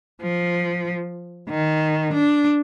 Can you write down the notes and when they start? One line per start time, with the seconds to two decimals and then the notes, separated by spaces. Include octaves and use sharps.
0.22 F3
1.49 D#3
2.14 D4